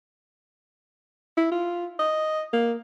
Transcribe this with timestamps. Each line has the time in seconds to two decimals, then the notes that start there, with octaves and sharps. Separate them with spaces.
1.37 E4
1.52 F4
1.99 D#5
2.53 A#3